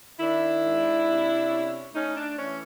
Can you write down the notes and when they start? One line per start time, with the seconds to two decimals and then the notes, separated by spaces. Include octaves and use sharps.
0.19 D#3 D4 E4
0.63 G#2
1.06 C3
1.49 C#4
1.93 A3 C#4 D#4
2.15 D4
2.37 E3 C#4